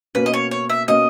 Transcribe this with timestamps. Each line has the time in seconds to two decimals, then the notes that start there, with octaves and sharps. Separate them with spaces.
0.15 B2 A#3 C#4 B4
0.26 D#5
0.34 C#5
0.51 C#5
0.69 E5
0.88 B2 A#3 C#4 D#5